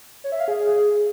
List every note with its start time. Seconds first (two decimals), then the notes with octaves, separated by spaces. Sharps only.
0.24 C#5
0.32 E5
0.40 F5
0.48 G#4